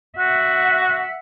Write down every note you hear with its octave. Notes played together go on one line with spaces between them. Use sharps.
F#4 E5 F#5